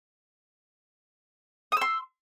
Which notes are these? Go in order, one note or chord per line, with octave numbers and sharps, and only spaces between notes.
C6 D#6 E6